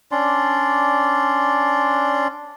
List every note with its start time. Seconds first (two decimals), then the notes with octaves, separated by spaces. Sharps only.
0.12 C#4 D4 D5 C6